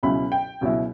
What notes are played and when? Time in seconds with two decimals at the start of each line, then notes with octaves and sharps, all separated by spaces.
0.03 C#2 B2 F#3 C#4 E4 B5
0.32 G5
0.61 C#2 B2 F#3 C#4 E4